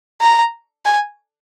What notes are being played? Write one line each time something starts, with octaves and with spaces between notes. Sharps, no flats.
A#5
G#5